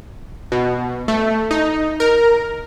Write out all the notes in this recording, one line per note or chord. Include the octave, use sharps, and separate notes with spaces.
B2
A3
D#4
A#4